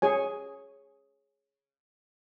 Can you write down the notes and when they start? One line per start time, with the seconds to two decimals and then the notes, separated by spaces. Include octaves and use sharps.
0.02 G#4 C#5 G#5